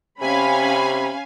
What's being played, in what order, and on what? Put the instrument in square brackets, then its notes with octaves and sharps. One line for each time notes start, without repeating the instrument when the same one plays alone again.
[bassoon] C3 [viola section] C#4 B5 [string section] F5 G#5